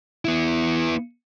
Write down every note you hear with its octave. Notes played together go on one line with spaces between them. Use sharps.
B3 E4